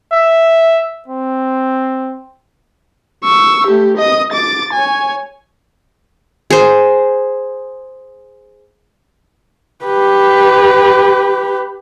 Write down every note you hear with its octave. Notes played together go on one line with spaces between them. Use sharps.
E5
C4
C#6 E6
A3 G4
D#5 D#6
D6 A6
C#5 G#5
G#4 C5
G4 B4